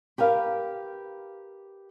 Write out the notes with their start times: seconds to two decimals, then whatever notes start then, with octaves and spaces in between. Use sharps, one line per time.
0.18 G4 A#4 B4 F5